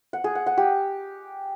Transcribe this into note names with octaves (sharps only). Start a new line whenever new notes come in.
F#5
G#4
F#5
F#5
G4